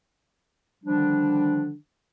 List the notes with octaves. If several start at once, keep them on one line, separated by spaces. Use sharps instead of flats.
D3 D#3 F3 G3 D4